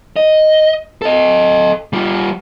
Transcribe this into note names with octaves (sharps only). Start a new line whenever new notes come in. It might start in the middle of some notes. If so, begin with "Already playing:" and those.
D#5
A4 D#5
G3 F4